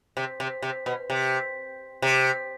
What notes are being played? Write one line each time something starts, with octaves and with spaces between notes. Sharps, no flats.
C3
C3
C3
B2
C3
C3